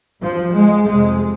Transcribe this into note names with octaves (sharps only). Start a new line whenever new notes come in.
G2 F3
G#3
F2 C3 G#3